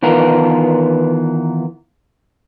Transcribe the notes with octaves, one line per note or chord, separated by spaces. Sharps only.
D#3 E3 B3 F4 A#4